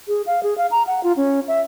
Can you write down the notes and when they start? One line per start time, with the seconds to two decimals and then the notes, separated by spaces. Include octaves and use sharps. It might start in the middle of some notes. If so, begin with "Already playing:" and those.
0.08 G#4
0.27 F5
0.43 G#4
0.58 F5
0.71 A#5
0.87 F#5
1.03 F4
1.17 C#4
1.48 E5